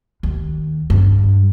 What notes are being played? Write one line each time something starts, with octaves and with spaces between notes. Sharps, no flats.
D#2
G2